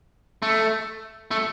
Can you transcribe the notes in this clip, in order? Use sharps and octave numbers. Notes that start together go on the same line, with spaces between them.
A3
A3